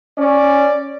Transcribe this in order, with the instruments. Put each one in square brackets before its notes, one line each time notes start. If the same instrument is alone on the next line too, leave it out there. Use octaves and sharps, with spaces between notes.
[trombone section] C#4 [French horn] D5